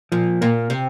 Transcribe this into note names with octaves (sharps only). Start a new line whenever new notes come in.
A#2 F3
A#2 A#3
C3